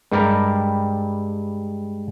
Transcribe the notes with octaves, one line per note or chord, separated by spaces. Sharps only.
G2 G3 G#3 A#4